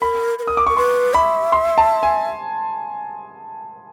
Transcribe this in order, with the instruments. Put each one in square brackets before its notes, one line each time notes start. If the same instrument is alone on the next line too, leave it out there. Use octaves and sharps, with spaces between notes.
[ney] A#4 [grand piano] B5
[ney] B4
A#4
[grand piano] D#6
D6
[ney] A#4 [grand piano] C#6
[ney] B4 [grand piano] C6
[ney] E5 [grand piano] B5
[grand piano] C6
A5
G#5